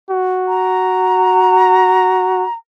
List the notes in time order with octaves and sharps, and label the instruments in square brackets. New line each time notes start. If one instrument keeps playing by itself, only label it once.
[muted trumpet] F#4
[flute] A#5